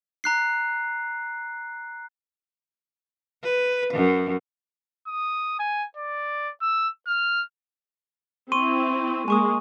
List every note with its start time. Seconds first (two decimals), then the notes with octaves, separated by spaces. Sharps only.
0.24 A#5 F#6 C7
3.43 B4
3.93 F#2
5.07 D#6
5.59 G#5
5.97 D5
6.61 E6
7.07 F6
8.52 C4 E4 C6 C#6 D#7
9.28 G#3 A#3 G#5 C#6 D#6